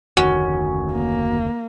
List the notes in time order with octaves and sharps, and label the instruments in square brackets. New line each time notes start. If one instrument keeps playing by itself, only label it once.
[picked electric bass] F1 D2 D#3 [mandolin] C#4 [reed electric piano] F#4
[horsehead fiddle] A#3